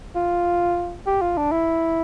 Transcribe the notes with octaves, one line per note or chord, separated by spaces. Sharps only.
F4
G4
F4
D4
E4